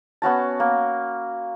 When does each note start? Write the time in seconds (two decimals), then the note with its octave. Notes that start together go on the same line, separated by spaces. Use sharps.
0.22 B3 C#4 F#4 A5
0.60 A#3